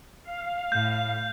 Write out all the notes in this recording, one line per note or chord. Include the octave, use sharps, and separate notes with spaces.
F5
A2 G6